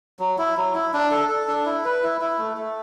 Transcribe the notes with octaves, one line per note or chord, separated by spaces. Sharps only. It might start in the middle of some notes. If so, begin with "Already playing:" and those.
F#3
E4
F#3
E4
D4
A4
A4
D4
E4
B4
E4
E4
A3
A3